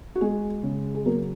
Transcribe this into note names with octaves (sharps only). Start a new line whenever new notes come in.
F#4
G#3 G#4
C#3
G#4
F#3 A#3 A#4